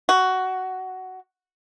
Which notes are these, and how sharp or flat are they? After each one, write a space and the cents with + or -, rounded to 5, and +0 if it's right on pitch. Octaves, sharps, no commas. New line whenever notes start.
F#4 +10